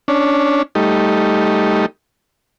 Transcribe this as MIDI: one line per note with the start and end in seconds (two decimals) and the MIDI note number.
0.08 0.62 61
0.08 0.62 62
0.75 1.86 55
0.75 1.86 57
0.75 1.86 63